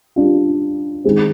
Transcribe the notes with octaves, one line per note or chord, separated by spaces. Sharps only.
G3 D4 F4
D#3 G#3 C4